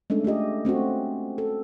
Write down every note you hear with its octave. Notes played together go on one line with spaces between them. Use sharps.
G#3 A3 C#4 D4 A4
A3 F4 G4 D#5
A3 C4 C#4 F#4
A4